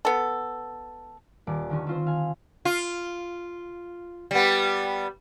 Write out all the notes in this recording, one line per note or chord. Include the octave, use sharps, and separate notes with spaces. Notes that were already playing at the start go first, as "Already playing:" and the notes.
B3 A4
D#1 D5
D3 D#3 C#4
C4 F4 C5
F5 G#5
F4
G3 B3